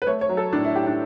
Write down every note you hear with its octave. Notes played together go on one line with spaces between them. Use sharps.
B4
A3 C#5
C#5
F#3
A4
A2 D4
E4
A2 G4
D4